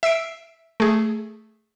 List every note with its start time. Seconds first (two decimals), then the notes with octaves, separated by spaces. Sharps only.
0.03 E5 E6 C7 D7
0.80 A3 G#4